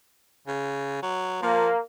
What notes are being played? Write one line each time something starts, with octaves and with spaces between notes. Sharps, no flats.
C#3
F#3
F3 A#3